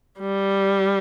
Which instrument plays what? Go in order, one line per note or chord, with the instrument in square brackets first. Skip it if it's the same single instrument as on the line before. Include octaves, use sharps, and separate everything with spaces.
[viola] G3